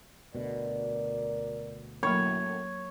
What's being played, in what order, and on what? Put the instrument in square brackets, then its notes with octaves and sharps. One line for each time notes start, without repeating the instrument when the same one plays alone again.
[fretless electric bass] D2 B2 [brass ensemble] A#4 D5
[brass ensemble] F#2 A2 [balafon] F#3 A#3 B5 [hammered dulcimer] C#5